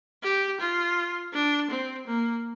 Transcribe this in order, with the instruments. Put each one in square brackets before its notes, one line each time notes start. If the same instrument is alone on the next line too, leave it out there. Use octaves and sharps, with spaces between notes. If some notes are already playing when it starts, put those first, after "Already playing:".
[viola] G4
F4
D4
C4
A#3